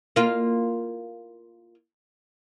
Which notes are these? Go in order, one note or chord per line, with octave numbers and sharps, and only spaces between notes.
A#3 F4